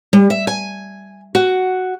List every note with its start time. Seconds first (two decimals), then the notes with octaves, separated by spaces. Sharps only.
0.13 G3
0.30 E5
0.47 G#5
1.35 F#4